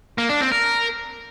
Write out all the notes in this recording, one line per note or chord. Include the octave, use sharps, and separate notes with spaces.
A#3
D4
C4
A#4